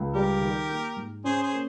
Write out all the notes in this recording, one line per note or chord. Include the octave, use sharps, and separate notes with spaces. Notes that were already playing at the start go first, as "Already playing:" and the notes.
Already playing: C#2
G3 G4 A#4
D#3
A#3
G#2
C#4 G#4 C5
G#4 C5
A#3